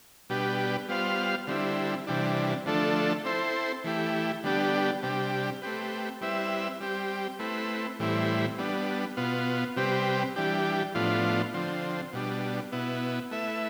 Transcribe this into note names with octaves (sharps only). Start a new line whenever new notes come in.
B2 G3 D4 G4 B4
G3 B3 F4 C5 F5
D3 G3 C4 E4
C3 E3 G3 D4
D3 F3 A3 D4 A4
C4 E4 A4 C5
E3 A3 E4 G4
D3 G3 B3 D4 G4
C3 G3 D4 G4
A3 C4 G4 B4
G3 C4 E4 B4 E5
G3 C4 G4
A3 C4 E4 B4
A2 E3 G3 C4 E4
G3 B3 D4
B2 B3 F4
C3 G3 C4 G4 B4
E3 G3 D4 G4
A2 F3 B3 D4 F4
D3 F3 C4
B2 G3 D4
B2 B3 E4
A3 E4 B4 E5